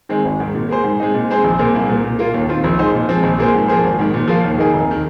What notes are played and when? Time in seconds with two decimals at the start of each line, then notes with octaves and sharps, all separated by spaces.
0.09 D#3 G#3 C4
0.25 G#1
0.40 G#2 D#3
0.55 A#2
0.69 A#3 G#4 C5
0.84 G#2
1.00 G#3 C4 D#4
1.14 A#2
1.29 G#3 C4 G#4 C5
1.44 A#1
1.59 A#2 A#3 G#4 C5
1.74 C2
1.89 A#2 A#3
2.04 A#2
2.19 A#3 F4
2.34 D#2
2.48 D#3 C4 F4
2.64 A#1
2.79 G#2 G#3 D#4 C5
2.94 A#2
3.09 F3 G#3 C4
3.23 A#1
3.38 A#2 A#3 G#4 C5
3.54 G#2
3.68 F3 A#3 G#4 C5
3.84 G#1
3.99 G#2 D#3
4.14 A#2
4.28 F3 A#3 F4
4.44 D#2
4.58 D#3 A#3 D#4 G#4
4.73 F1
4.91 D#3